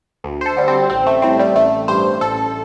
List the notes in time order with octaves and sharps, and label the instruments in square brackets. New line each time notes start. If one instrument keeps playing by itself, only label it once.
[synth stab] D2
C5
A4
D3 G3
C4
A1 C4
A3
A2 G3 C4
G3
A1 A3
G2 G3 C5
A1 A4